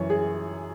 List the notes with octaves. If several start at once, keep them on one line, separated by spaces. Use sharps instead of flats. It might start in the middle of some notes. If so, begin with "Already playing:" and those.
Already playing: F#2 E3 C#5
G#4